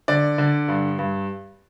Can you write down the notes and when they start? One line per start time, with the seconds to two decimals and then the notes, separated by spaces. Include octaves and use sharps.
0.08 D3 D5
0.38 D3
0.68 G2
0.99 G2